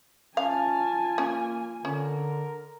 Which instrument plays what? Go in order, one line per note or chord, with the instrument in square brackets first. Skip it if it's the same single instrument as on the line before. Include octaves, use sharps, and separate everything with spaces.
[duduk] C#4 [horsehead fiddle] F4 G#5 [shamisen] F5 [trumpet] A5
[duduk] A#3 [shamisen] C#4
[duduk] D3 [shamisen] C#4 [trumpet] A#4